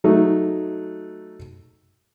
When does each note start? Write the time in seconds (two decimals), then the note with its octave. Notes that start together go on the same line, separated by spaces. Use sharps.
0.04 F#3 A3 D#4